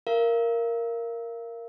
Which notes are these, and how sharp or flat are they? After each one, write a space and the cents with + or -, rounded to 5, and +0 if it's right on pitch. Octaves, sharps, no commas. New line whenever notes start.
A#4 +0 F5 -35